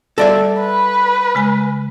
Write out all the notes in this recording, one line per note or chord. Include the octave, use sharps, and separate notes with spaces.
G3 A4 D5 E5
B4
C#3 G#3 G#5